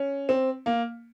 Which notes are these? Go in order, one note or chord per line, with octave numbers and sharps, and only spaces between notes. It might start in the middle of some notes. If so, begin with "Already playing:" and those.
Already playing: C#4
C4
A#3